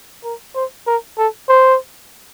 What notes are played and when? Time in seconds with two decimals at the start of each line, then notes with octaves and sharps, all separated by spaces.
0.24 A#4
0.55 C5
0.87 A#4
1.18 A4
1.49 C5